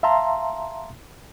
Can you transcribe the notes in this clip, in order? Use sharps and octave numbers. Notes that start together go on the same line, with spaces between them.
E5 F5 A5 A#5 C6